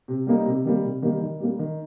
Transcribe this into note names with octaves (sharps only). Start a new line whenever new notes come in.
C3
G3 A#3 D#4
C3
D#3 G3 A#3
C3
D#3 G3 A#3
D#3
G3 A#3
D#3